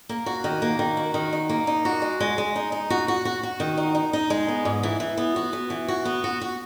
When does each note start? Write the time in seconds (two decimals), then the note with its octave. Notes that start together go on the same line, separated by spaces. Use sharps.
0.09 A#3
0.26 F#4
0.44 D#3
0.62 A#3
0.79 D#3
0.97 F#4
1.14 D#3
1.33 D#4
1.49 A#3
1.67 D#4
1.85 F#4
2.02 G#3
2.20 G#3
2.38 G#3
2.56 D#4
2.72 D#4
2.90 F#4
3.08 F#4
3.25 F#4
3.43 F#4
3.60 D#3
3.78 D#4
3.95 D#4
4.13 D#4
4.30 G#3
4.48 B3
4.65 G#2
4.83 E3
5.00 E3
5.17 B3
5.36 F#4
5.53 B3
5.70 E3
5.88 F#4
6.05 B3
6.24 F#4
6.41 F#4